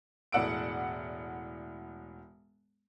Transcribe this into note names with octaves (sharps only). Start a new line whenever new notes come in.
E1 A2 D5 F#5 E6 D7